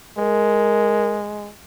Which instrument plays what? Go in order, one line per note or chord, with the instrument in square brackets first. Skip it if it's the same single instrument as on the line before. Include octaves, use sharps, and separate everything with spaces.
[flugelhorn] G#3 [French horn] A#4